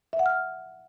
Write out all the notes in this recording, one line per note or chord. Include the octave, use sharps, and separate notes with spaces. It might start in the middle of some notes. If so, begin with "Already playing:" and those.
E5
F#5
F6